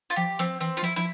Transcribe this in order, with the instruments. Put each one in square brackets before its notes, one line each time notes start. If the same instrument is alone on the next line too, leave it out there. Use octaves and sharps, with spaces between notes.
[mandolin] F4
[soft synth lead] F3 [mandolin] G4
[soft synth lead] F3 [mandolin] C4
[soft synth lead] E3 [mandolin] C4
[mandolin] F4
[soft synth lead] F3 [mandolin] E4
[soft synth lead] F3 [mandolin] E4